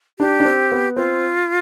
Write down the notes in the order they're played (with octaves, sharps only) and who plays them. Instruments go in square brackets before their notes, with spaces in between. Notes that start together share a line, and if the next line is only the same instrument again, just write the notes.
[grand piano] D4 [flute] G4
[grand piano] D4
C4
B3
[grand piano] C4 [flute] F4